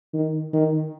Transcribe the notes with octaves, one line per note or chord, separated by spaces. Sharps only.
D#3
D#3